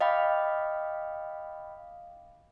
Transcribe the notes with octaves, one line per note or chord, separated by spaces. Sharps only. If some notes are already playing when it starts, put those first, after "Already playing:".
D#5 F5 G5 B5 D6